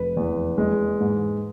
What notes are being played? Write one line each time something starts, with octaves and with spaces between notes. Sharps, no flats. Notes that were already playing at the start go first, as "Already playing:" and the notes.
Already playing: F1 E3 B4
E2
G#3
G#2